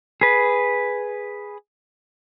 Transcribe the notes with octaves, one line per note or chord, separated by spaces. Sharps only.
G#4 B4